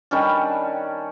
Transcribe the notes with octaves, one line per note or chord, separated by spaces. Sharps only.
D#3 G3 C#4 D4